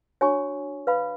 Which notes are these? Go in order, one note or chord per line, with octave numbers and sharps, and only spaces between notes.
D4 F#4 C#5 G#5 C#6
B4 F5 B5